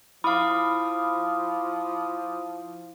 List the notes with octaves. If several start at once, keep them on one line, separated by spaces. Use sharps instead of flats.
F3 E4 F5 B5 D6 D#6 F6